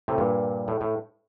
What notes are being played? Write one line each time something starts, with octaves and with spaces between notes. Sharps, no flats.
A2 C3
G2 A#2
A2
A2